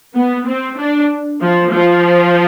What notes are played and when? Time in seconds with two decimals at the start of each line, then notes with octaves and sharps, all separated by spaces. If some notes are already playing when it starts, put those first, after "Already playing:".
0.14 B3
0.46 C4
0.78 D4
1.41 F3
1.72 F3